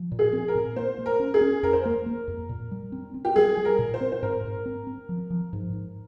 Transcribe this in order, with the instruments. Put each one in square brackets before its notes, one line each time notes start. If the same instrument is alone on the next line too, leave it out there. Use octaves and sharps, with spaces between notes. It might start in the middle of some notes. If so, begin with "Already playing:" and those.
Already playing: [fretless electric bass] F3
A#2
[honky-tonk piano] G#4
[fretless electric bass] C4
[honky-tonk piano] A#4
[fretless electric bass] A#2
[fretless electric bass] A#3 [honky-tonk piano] C5
[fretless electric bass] A#3
[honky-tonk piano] A#4
[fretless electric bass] C#4
[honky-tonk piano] G#4
[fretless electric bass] C#4
[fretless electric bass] F2 [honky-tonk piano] A#4
[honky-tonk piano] C5
[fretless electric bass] A#3 [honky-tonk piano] A#4
[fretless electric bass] A#3
F2
A#2
G3
C4
C4
[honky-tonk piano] G4
[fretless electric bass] G3 [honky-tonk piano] G#4
[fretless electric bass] G3
[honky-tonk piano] A#4
[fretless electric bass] A#2
[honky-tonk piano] C5
[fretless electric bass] C4
[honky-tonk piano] C5
[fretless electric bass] G#2 [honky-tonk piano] A#4
[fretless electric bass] G#2
C4
C4
F3
F3
G#2
G#2